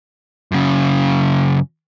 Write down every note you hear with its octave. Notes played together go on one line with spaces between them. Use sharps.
F#2 C#3